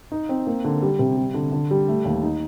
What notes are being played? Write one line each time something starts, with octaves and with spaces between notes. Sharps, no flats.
D#4
C4
A#3
D3
G3
C3
G3
D3
D3
G3
A3
D#2
D#4